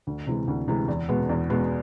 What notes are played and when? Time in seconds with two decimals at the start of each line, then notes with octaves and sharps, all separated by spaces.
0.07 D2
0.27 C3 E3 G#3
0.48 D2
0.68 C3 E3 G#3
0.88 E2
1.09 B2 G#3 B3
1.29 E2
1.50 B2 G#3 B3